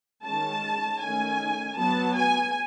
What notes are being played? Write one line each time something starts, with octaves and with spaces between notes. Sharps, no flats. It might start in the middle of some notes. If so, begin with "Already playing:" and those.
D#3 G#3 C#4 A5
D#3 A3 C#4 G#5
F#3 B3 A5
G#5